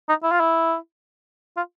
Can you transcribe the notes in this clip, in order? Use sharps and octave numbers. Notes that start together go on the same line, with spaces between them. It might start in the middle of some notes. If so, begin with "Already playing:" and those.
D#4
E4
F4
E4
F4